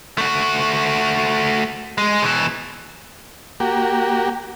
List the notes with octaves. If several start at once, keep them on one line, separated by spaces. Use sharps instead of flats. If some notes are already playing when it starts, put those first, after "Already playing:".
A3 F#4
G#3
B2 E3
A#3 F#4 G4